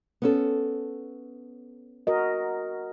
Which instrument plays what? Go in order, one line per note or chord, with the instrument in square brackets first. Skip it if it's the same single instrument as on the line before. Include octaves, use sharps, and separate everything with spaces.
[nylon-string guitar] B3 C#4 A4
[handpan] F#4 A#4 D#5